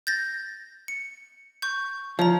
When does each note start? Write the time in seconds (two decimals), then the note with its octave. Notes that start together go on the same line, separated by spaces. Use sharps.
0.07 G6 A6 A#6
0.88 C#7
1.62 C#6 G6
2.19 F3 C#5 A#5